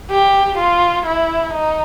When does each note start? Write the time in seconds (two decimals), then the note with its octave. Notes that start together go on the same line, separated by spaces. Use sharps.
0.11 G4
0.58 F4
1.06 E4
1.53 D#4